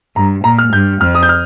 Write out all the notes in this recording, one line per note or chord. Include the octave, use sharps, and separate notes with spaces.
G2 A#5
A#2 A#5
F6
G2 G6
F2 F6
D#6
G6
F6